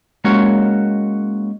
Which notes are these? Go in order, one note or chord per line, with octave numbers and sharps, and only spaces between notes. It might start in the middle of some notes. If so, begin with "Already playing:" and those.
G#3 A#3 C#4 F#4 C#5